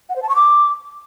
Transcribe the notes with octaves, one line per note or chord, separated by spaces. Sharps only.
F#5
C5
A5
C#6
D6